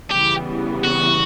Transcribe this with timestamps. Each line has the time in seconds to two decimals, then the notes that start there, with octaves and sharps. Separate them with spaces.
0.11 C#3 E3 G3 B3 G4
0.85 F#4